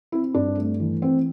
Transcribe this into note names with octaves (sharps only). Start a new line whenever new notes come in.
C4 E4
G2 D4
A3
E3
C4